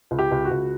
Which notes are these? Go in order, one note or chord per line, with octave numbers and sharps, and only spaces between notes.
C#2
G4
C#2
F#4
C#2